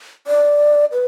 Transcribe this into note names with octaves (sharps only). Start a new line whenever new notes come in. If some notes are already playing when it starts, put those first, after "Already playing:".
D5
B4